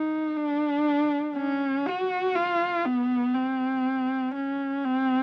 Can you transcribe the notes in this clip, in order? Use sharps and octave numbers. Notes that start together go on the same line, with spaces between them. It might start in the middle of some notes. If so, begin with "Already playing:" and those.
Already playing: D#4
D4
C#4
F#4
F4
B3
C4
C#4
C4